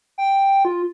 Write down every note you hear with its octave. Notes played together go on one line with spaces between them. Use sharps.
G5
F4